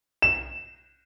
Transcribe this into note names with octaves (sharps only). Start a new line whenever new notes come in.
E7